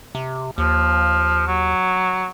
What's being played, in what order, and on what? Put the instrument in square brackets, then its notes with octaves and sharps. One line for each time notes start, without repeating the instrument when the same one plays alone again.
[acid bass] C3
[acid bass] D#2 [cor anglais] F3
[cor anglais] F#3